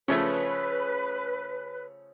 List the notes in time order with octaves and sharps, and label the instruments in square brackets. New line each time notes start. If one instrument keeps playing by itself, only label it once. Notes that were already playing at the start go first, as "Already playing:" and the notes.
[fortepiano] C#3 F3 A3 [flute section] B4 [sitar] C#5